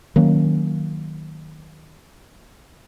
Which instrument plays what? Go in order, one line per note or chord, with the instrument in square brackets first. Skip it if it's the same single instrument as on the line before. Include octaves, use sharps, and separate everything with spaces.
[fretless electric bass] D#3 F#3 A#3 C#4